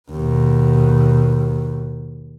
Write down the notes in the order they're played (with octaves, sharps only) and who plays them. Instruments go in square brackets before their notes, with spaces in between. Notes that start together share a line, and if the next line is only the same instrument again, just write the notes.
[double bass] D#2 B2